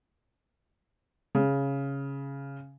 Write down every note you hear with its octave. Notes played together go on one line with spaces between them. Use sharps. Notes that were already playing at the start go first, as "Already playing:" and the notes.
C#3